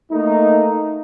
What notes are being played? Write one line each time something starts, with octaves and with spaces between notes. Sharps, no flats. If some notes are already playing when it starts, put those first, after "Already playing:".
A3 A#3 D#4